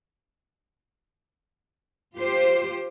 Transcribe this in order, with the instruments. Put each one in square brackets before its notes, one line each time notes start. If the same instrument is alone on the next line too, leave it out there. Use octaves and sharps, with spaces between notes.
[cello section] F4 G4 C5